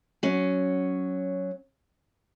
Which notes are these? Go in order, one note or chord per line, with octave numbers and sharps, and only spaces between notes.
F#3 C#4